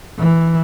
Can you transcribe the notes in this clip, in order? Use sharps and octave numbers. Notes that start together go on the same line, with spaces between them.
E3